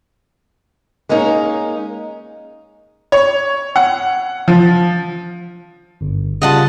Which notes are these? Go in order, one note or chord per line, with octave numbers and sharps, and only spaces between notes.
G#3 A#3 C#4 D#4 A#4
C#5
F#5
F3
G1
C#3 G3 F4 D#5 F#5 A5